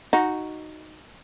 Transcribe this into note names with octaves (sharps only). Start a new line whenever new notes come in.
D#4 F#4